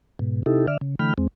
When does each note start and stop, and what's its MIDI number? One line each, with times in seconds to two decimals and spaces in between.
0.19 0.43 44
0.19 0.43 47
0.46 0.66 48
0.46 0.66 63
0.46 0.66 64
0.46 0.66 67
0.46 0.66 69
0.68 0.77 50
0.68 0.77 74
0.68 0.77 76
0.68 0.77 89
0.81 0.95 49
0.99 1.14 50
0.99 1.14 52
0.99 1.14 57
0.99 1.14 79
0.99 1.14 83
0.99 1.14 89
1.18 1.27 40
1.18 1.27 56
1.18 1.27 60